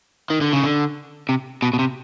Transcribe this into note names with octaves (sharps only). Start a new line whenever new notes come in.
D#3
D3
C#3
D3
C3
B2
B2
C3